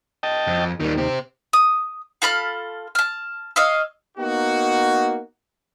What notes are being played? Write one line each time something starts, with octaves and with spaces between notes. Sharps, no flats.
D#5 G5 A5
F2
D#2 D#3 G3
C4 G4
D#6
F4 A4 B5 F6
A5 F6
C#5 D#5 F5 E6
A#3 B3 D#4 F#4